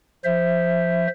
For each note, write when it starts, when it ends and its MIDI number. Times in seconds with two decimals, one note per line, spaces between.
0.24 1.07 53
0.24 1.07 72
0.24 1.07 76